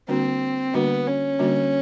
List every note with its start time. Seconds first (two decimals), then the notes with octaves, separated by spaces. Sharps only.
0.08 D3 G3 A#3 C4 D4 F#4
0.74 D3 G3 A#3 B3 D4 F#4
1.07 C#4
1.39 D3 G3 A#3 D4 F#4